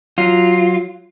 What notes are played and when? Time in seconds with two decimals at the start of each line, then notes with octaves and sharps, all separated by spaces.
0.18 F#3 F4